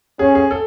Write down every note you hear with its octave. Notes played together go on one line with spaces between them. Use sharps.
C#4 G#4
G#4
A4